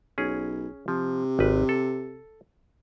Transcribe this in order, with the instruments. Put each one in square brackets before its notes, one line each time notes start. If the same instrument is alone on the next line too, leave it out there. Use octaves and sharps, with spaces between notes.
[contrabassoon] B1 [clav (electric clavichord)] C#4 G#4
[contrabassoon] C3 [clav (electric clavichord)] F3
[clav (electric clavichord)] G#1 B4
A4